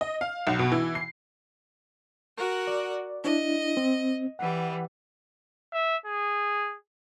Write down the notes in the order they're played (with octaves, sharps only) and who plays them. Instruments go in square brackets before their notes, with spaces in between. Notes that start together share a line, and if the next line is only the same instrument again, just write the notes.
[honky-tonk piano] D#5
F5
B1
B2
E3
C7
[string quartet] F#4 A#4 F#5
[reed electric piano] D5
[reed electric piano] D4 E4 [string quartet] D#5
[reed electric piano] C4
[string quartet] E3 G3 [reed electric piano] F#5
[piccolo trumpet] E5
G#4